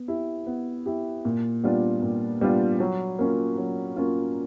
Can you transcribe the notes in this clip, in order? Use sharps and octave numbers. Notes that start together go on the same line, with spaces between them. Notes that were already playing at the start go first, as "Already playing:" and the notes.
Already playing: B3
E4 G4
B3
E4 G4
A#2
G3 B3 D4 F4
A#2
G3 B3 D4 F4
F#3
A#3 C#4 F4
F#3
A#3 C#4 F4